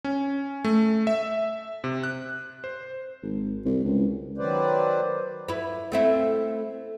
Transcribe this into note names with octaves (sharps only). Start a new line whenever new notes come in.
C#4
A3
E5
C3
F#6
C5
G#1
C2
C#2
D#3 F#3 B4 C5 D5
E4 B4
A3 C4 E4